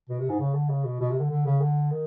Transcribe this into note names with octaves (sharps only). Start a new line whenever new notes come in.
B2
C3
G#2
C#3
D3
C#3
B2
B2
C3
D3
D3
C#3
D3
D#3